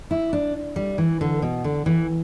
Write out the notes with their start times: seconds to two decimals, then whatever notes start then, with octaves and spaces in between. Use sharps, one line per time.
0.11 E4
0.33 D4
0.76 G3
0.98 E3
1.21 D3
1.42 B2
1.64 D3
1.86 E3